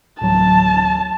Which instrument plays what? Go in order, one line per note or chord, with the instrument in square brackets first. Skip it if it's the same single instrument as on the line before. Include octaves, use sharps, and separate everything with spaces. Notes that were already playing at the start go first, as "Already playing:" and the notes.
[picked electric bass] D1 A1 F#3 [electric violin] A5